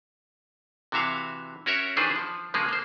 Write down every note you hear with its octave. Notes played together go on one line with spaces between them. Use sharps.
C3 E3 F#4 E5 F5
C#4 F#4 A#4 C#5 E5
D#3 E3 D4 G#4 B4 C5
F3
C#3 F3 G#3 A#3 G#4
A#3 C5